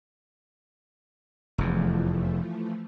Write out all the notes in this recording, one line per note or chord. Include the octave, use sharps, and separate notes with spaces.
F1 E2 E3 F3 A3